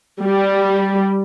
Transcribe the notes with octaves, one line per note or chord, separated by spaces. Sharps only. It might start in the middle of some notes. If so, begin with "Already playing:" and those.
G3